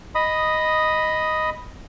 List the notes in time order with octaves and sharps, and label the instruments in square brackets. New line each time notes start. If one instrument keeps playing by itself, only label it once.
[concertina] D#5 B5 D#6